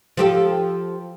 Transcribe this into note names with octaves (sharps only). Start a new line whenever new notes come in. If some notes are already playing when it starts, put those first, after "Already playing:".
F3 G4 A4